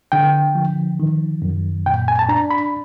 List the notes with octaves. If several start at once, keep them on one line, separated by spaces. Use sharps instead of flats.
D3 G5
F3
D#3
F#2
A#2 G5
G#5
A5
D4 A#5
B5